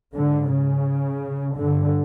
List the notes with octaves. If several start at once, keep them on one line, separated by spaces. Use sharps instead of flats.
G#2 D3
C#3
G2 D3